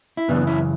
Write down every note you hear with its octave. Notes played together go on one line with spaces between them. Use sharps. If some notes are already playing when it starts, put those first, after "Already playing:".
E4
F#2 C#3 E3 B3 D4
C#4 E4